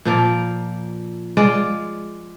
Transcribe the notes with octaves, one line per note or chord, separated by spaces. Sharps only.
A#2 F3 A#3
G#3 F4 D5